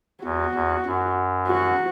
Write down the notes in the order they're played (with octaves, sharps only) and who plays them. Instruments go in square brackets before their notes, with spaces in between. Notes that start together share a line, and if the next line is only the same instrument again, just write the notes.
[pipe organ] E2 [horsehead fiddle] F#4
[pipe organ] E2
F#2
[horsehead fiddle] F#4